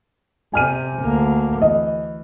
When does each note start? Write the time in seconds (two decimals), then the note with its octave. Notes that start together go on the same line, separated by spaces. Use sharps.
0.53 C3 G#5 F6 D#7
1.03 D2 A#3
1.62 E3 D#5